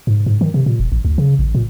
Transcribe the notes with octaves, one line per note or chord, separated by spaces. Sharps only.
G#2
G#2
D#3
C3
A#2
E1
A1
D2
C#3
A1
A#2